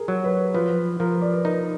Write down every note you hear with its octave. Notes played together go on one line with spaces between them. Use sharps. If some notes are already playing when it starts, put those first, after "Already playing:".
Already playing: G#4 A#4
F#3
B4
F3 B4
F3 A#4
D5
B4
D#4 A#4